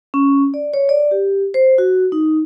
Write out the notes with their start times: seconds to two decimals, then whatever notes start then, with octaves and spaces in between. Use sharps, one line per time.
0.14 C#4
0.54 D5
0.74 C#5
0.89 D5
1.11 G4
1.54 C5
1.78 F#4
2.12 D#4